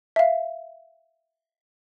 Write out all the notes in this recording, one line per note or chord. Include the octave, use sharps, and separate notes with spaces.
E5 F5